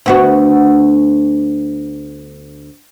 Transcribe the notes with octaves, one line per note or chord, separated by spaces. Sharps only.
D2 B3 F#4